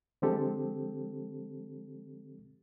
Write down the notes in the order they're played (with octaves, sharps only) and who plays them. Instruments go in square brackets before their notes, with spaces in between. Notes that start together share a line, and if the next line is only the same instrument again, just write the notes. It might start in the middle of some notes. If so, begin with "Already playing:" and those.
[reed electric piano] D3 F3 G#3 C4 G4 A4